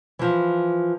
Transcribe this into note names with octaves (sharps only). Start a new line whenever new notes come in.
E3 F3